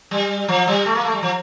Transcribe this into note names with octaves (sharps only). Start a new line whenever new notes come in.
G3
F3
G3
A3
A#3
A3
G3
F3